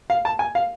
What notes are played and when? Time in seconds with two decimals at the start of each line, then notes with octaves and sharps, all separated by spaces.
0.10 F5
0.25 A5
0.39 G#5
0.55 F5